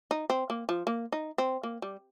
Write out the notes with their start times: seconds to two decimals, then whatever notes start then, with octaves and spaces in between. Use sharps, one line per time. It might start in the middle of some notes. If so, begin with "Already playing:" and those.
0.11 D#4
0.30 C4
0.50 A#3
0.69 F3
0.87 A#3
1.12 D#4
1.38 C4
1.63 A#3
1.82 G3